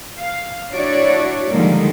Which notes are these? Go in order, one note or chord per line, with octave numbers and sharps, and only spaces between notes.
F5
D4 E4 F#4 C#5 D5
D3 D#3 F3 G3 G#3 A#3